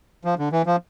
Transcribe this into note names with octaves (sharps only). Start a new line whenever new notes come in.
F3
D3
E3
F3